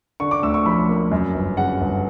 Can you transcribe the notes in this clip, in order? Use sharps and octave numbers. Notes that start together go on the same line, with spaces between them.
D3 C#6
D6
D2 E6
C#6
F3 B5
A#3
F#2
G1
C#3 F#5
G1